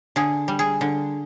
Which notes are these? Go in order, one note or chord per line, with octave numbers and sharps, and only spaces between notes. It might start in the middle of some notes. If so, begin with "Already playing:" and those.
D3 G#4
G3
G#4
D3